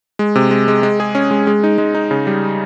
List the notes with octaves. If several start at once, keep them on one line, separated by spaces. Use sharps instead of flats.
G#3
C3
G#3
G#3
G#3
G#4
C#4
G#3
G#3
D#4
G#3
D#4
C#3
G3